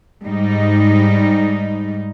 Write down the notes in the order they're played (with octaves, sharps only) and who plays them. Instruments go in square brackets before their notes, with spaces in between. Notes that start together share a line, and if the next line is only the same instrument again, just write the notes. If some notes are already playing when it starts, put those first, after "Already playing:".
[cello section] G#2 G3 D#4